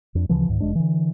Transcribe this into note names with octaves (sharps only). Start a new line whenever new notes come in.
F2 D4
D2 C#3 E3 F3
C#2 G#2 D#3
F1 G2 G#3 D4
D3 E3